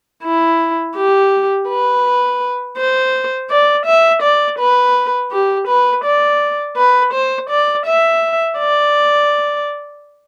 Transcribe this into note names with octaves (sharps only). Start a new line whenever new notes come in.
E4
G4
B4
C5
D5
E5
D5
B4
G4
B4
D5
B4
C5
D5
E5
D5